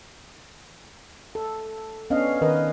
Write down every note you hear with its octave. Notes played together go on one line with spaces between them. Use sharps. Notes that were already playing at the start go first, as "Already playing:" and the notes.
A4
B3 C#4 D4 D#5 F5
D#3 A#4 B4 D#5